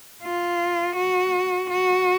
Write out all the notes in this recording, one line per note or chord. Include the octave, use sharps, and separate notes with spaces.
F4
F#4
F#4